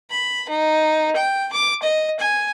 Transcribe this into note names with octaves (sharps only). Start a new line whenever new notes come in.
B5
D#4
G5
D6
D#5
G#5